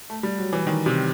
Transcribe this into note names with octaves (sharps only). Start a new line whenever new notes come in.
A3
G3
F#3
E3
D#3
C3